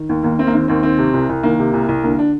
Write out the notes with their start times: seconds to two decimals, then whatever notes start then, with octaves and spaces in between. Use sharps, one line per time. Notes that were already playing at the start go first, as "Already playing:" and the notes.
Already playing: D#3
0.09 D#2
0.23 D#2 A#3
0.39 D#3 C4
0.47 A#3
0.54 D#3 C4
0.68 D#2 C4
0.83 D#3 C4
0.99 C3
1.13 C2
1.29 C2
1.43 D#3 A#3
1.59 C3
1.73 C2
1.88 C2
2.03 D3 A#3
2.19 D4